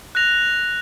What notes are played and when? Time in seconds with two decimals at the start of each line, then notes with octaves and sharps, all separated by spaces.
0.15 F#6 A#6 F7